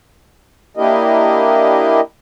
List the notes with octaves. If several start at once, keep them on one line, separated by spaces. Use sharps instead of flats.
A#3 D4 E4 G4 A#4 D#5